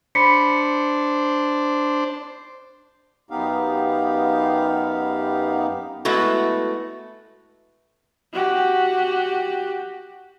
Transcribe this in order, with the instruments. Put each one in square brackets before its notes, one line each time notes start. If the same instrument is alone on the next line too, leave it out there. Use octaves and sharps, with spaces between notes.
[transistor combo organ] D4 C5 [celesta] B5 B6 C#7
[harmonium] F#2 B3 D#4 G4 F5
[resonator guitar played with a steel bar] G#3 A3 B3 E4 F#4
[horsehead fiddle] F#4 G4